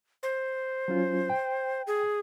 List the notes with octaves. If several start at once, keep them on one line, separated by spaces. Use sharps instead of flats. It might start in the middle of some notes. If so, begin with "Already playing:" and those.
C5
F#3 C#4 F4
G5
G#4